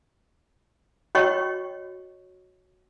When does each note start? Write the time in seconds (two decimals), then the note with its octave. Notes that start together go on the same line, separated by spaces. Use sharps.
1.15 F#4 C#5 D#5 G5 C#6